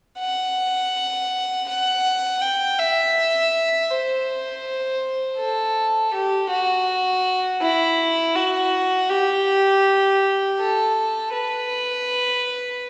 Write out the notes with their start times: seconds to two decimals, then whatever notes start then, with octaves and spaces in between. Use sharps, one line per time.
0.19 F#5
1.68 F#5
2.42 G5
2.79 E5
3.91 C5
5.39 A4
6.13 G4
6.50 F#4
7.61 E4
8.35 F#4
9.09 G4
10.59 A4
11.33 B4